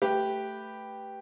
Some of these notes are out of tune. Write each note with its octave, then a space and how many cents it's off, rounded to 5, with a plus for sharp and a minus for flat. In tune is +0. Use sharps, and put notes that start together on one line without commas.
A3 +0 G4 +0 B4 +0